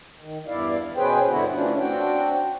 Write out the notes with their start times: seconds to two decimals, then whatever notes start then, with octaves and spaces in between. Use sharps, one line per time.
0.21 D#3
0.48 E2 G2 E4 D5 F5
0.96 B2 C#4 G#4 B4 C5 G5
1.29 G2 D3 B3 E4 F#4
1.54 A2 E3 C#4 D4 F4
1.80 C4 D4 F#4 G5